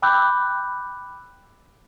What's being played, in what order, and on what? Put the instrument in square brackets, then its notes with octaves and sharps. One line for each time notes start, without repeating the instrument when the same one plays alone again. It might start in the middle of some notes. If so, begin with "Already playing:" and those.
[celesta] G5 B5 D6 E6 F#6 G6